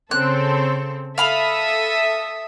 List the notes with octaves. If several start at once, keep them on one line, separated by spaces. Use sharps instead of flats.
C#3 C4 A4 F#6
A4 E5 F5 B5 D#6